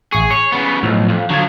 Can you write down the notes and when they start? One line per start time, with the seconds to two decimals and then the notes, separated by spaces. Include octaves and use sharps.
0.12 A1 G#4 C#6
0.31 C#5 C#6
0.52 C#3 B3
0.83 B1 A2 F3
1.09 F2
1.30 D3 F3 F#3 G#6